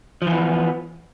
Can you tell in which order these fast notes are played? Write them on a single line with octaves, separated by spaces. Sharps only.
F3 E3 B3